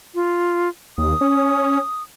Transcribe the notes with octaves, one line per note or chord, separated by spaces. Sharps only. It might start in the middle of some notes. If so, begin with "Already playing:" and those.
F4
D#2 D#6
C#4